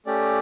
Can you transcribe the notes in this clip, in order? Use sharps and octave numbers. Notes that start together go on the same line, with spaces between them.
A3 C#4 G4 D5